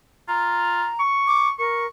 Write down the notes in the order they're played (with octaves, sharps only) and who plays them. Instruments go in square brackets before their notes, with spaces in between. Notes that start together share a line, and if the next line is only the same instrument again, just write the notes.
[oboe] F4 [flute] A#5
[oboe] C#6
[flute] D6
[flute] A#4 [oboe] C#6